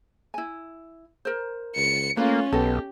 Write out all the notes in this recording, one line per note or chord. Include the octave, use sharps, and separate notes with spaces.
E4 G#5
A#4 C5
C#2 C#7
A3 A#3 C#4 F4 B4
B1 B3 G4 A4 D#5